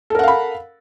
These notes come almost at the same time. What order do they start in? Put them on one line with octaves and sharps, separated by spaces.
A4 A#4 F#5 F5 B5